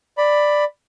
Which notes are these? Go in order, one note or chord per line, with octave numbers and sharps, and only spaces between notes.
D5 B5